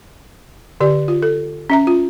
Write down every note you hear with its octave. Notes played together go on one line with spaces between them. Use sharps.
D3 G4 D5
F4
A4
C#4 E5 A#5
F4